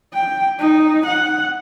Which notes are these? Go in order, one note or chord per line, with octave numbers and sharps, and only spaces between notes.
G5
D#4
F#5